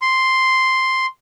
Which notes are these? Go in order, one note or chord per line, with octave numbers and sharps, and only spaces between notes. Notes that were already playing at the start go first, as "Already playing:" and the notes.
C6